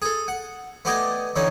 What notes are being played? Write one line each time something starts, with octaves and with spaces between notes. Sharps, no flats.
G#4 A4
F#5
A3 B3 G4 D5 D#5 G#5
D3 E3 D#4 C#5